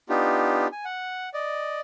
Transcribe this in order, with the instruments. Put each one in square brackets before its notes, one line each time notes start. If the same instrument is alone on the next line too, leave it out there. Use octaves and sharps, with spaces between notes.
[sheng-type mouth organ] B3 D4 D#4 F4 G4
G#5
F#5
D5 D#5